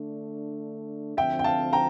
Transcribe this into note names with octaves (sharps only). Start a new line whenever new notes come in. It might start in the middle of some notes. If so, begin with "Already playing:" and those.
Already playing: D3 A3 D4
D2 D3 F3 C4 E5 G5
G5
F5 A5
G5 A#5